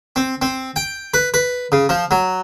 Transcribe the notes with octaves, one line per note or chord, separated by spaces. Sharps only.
C4
C4
G5
B4
B4
C#3
F3
F#3